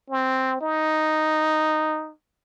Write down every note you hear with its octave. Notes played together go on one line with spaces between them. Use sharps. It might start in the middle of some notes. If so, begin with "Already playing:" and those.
C4
D#4